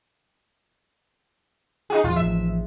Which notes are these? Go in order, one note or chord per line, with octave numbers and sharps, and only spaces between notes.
D#4 F#4 G#4
D#1 F3 F4
A1 F3 E5